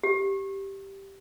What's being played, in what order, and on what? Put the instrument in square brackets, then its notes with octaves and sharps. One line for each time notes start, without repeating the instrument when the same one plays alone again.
[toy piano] G4